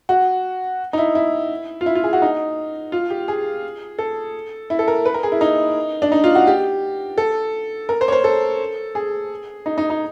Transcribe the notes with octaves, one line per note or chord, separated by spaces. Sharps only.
F#4
D#4
E4
E4
F4
E4
F4
G#4
F#4
D#4
F4
G4
G#4
A4
E4
A4
A#4
B4
A#4
G#4
E4
D#4
D4
D#4
F4
F#4
G4
A4
A#4
C5
C#5
C5
A4
G#4
D#4
D#4
D#4